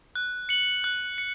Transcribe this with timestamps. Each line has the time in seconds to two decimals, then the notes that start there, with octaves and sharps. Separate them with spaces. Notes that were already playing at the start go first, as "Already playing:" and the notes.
0.15 F#6
0.49 C#7 F#7
0.84 F#6
1.18 C#7